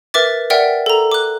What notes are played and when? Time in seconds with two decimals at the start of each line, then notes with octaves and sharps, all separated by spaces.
0.14 A#4 B4 E5 D6 A6
0.50 A#4 D5 E5 F#5 G5
0.86 A4 A#5
1.12 D6 F#6